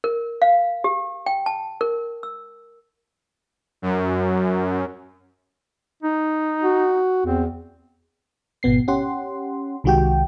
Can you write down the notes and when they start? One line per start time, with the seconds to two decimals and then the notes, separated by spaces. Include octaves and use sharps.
0.04 A#4
0.42 F5
0.84 G4
1.26 G5
1.46 A5
1.81 A#4
2.23 E6
3.82 F#2
6.03 D#4
6.63 F#4
7.25 E2 C4
8.63 G#1 B2 B3 C7
8.88 C#4 G4 F#5 C6
9.84 C2 D#3 G#3 F#4 G4 G5